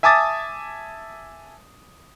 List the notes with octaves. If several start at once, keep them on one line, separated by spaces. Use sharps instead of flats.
E5 G#5 A5 D6 D#6 A6